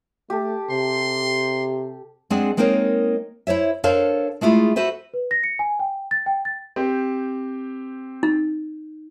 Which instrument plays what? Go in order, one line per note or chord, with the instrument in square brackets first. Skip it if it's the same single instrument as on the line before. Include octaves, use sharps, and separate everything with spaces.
[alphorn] A3 [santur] G4 A4
[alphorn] C3 [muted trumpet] C6
[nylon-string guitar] G#3 C4 D4 G#4 F#5
G#3 A#3 C4 D#4 A#4 C#5
E4 C5 C#5 E5
D4 A4 A#4 C5 C#5 F5
G#3 A3 E4 F4 G#4
F#4 A4 B4 C5 E5
[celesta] B4
A#6
C#7
G#5
G5
A6
G5
A6
[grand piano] C4 G4
[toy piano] D#4